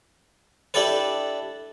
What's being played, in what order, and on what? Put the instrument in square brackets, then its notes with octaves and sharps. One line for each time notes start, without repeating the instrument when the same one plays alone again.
[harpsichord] D4 E4 G4 A4 B4